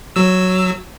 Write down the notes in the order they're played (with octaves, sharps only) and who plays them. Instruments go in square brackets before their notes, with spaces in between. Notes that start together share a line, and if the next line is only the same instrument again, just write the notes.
[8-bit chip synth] F#3 E6